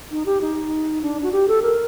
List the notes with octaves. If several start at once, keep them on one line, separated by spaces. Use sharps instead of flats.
D#4
G4
D#4
D4
F#4
G4
A4
A#4